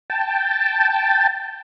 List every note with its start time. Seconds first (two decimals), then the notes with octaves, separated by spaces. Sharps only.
0.10 G5 A5